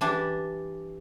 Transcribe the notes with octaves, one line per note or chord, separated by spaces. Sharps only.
E3 D4 G4